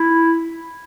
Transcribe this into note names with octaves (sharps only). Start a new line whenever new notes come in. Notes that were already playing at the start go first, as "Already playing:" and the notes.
Already playing: E4